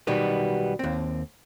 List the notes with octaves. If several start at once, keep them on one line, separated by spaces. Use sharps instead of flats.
B1 B2 D#3 G3 B3
D#2 C4